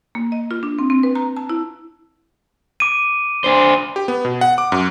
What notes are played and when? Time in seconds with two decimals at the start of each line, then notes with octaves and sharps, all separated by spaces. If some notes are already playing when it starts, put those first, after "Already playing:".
0.15 A#3
0.32 D#5
0.51 F4
0.63 D4
0.79 C4
0.90 C4
1.03 B4
1.15 A#5
1.37 A5
1.50 E4
2.80 D6 D7 D#7
3.44 D4 C5 G7
3.96 G4
4.08 B3
4.25 B2
4.41 F#5
4.58 D6
4.72 F#2